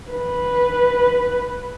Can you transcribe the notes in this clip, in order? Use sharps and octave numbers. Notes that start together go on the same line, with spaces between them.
B4